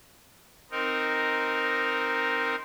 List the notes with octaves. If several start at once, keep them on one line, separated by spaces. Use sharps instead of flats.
C4 D#4 A#4